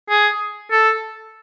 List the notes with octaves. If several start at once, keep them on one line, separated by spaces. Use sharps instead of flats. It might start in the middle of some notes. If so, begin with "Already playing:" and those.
G#4
A4